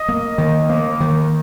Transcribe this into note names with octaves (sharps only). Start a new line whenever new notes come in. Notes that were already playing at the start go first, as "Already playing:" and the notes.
Already playing: D#5
A#3
D#3
A#3
D#3